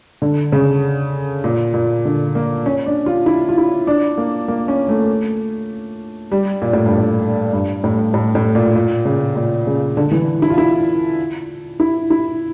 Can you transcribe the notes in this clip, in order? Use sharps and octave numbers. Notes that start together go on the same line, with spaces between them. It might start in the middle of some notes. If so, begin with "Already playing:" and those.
D3
C#3
A#2
A#2
D3
A#3
C#4
D4
F4
E4
F4
E4
D4
A#3
A#3
C#4
A3
G3
A#2
A2
G2
A2
G2
A2
A2
A2
A#2
A#2
C#3
A#2
C#3
D3
E3
E4
F4
E4
E4
E4